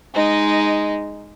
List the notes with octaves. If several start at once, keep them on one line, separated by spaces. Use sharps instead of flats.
G#3 D#4